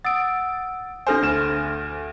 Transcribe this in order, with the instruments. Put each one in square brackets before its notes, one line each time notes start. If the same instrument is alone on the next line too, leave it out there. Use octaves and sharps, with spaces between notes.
[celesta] F#5 D#6 E6 [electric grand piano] A6 D7
[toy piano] D4 A4 G#5 [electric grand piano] C5 F6 A#6
[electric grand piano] D2 E7 [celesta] F6